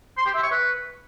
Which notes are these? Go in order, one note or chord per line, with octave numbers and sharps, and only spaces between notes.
C6
G4
E5
C#6
B4